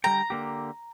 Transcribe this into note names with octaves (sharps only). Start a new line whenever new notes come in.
D3 G3 G5 A#5
D3 A#3 G4